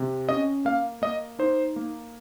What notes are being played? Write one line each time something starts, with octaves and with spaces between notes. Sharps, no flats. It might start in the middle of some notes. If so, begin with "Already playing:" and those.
Already playing: C3
C#4 D#5
A#3 F5
A#3 D#5
D#4 C5
A#3